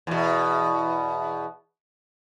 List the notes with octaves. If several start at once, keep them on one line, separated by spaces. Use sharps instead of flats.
E2 B2